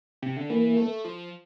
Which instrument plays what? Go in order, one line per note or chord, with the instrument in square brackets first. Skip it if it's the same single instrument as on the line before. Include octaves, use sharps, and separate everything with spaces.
[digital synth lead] C3
D3
[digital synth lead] E3 [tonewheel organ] A#3
[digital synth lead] A3
F3